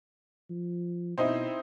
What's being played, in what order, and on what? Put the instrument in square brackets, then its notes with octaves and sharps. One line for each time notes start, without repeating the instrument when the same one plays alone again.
[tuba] F3
[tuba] B2 [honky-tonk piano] C4 D#4 E4